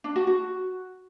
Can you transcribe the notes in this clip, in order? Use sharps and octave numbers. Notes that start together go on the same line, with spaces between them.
D4
F#4
F#4